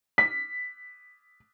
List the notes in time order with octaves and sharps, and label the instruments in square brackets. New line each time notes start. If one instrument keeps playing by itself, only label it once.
[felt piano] B6